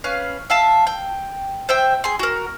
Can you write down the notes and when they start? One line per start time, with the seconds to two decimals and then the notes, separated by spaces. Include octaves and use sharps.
0.04 C#4 B4 F5
0.50 E5 F5 A5
0.87 G5
1.69 C5 E5 G5
2.04 G#4 C6
2.19 F#4 A#4